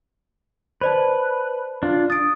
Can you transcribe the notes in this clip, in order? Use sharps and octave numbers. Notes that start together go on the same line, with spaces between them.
B4 C5 D5 A5
D4 F4
D#6 A6 D7